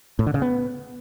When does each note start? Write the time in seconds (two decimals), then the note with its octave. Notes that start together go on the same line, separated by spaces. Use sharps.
0.19 A2
0.27 D3
0.34 C#3
0.42 B3